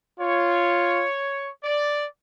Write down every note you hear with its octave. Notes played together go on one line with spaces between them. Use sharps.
F4 C#5
D5